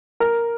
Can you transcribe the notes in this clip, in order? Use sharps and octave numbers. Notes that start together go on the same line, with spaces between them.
A#4